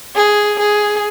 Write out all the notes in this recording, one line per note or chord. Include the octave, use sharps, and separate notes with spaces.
G#4
G#4